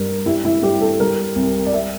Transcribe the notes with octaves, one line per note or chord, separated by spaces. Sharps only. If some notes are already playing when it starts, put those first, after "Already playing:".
Already playing: G2 G3 A#4
G3 E4
E4
G2 G4
A4
G3 A#4
C2
D5
G3 E5